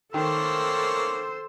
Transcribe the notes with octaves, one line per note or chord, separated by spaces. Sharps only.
D#3 A3 A#3 C#4 A4 C5 E6